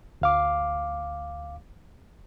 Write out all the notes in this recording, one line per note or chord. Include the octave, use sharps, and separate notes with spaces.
D2 F5 D6